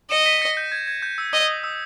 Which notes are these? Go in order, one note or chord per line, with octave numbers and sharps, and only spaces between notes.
D#5 C#7 E7
B6 D#7
A#6 C#7
G6
G#6
G#6
G6
E6
D#5 D#6
D#6
E6